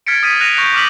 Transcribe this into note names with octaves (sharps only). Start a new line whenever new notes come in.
F6 G#6 A6 B6 C#7 D7
D#6 F6 G#6 A6 B6 D#7
F#6 A#6 C#7 D#7 F7
C#6 G6 A#6 F7
D6 D#6 F6 B6 D#7 F#7